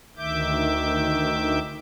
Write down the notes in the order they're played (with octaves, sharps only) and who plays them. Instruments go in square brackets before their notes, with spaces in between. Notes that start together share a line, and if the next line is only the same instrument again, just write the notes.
[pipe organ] D2 D#3 E5 D6 G6